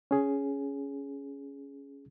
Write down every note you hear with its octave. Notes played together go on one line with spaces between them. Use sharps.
C#4 G#4